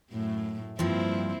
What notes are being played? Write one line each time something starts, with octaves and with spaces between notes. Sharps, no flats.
F#2 A2 A3
G2 F3 A#3 C4 E4